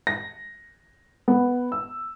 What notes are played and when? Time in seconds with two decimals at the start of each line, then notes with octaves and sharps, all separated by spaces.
0.07 A#6
1.28 B3
1.72 E6